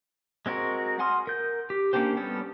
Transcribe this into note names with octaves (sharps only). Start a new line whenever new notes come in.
G#3 C4 F#4 A#4
F#5 G#5 C6 D#6 F6
A#4 G6
G4
A#3 C#4 D4 G4 C5
G3 B3 C#4 A4